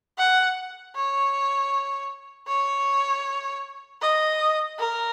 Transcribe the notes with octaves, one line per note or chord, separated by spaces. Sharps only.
F#5
C#5
C#5
D#5
A#4